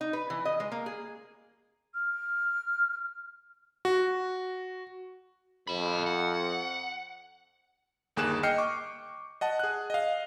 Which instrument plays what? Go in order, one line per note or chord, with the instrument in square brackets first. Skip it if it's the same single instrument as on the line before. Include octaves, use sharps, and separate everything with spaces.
[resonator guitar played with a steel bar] D#4
B4
E3
D#5
G#3
A#3
G#4
[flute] F6
[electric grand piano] F#4
[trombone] F2 [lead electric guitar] D#5 B5
[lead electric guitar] F#5
[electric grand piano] G1 D#2 A#3 G#4 F#6 E7
D#5 G5 F6 G6 C7 C#7
C#6 D6
D#5 F#5 A5
G#4 F#6
D#5 F5